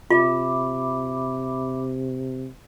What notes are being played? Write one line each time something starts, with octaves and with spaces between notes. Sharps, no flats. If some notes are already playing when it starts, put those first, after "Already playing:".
C3 F4 E5 B5 D6